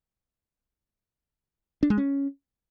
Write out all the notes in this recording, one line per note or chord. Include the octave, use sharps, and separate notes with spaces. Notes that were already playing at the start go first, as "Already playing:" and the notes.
D4
G#3
C#4